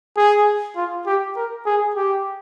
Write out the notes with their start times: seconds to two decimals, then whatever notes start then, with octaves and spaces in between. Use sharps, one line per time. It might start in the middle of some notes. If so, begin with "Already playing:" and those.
0.17 G#4
0.76 F4
1.06 G4
1.36 A#4
1.66 G#4
1.96 G4